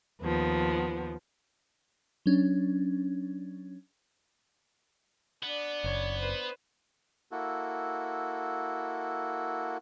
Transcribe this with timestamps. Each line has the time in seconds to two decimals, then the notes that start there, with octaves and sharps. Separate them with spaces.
0.22 D#2 F3 B3
2.26 F#3 C#4 D4
5.43 B3 D4 D5
5.84 F#1 C#5
6.21 B4 C5
7.31 A#3 E4 F#4 A4